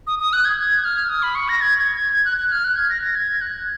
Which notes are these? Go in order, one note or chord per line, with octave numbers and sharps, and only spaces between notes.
D#6
D#6
F#6
G#6
G#6
F6
D#6
B5
C#6
A#6
G#6
G#6
G#6
G#6
F#6
F#6
F6
F#6
G#6
A#6
A#6
G#6
F#6